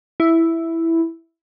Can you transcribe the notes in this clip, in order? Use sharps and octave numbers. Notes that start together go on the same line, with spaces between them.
E4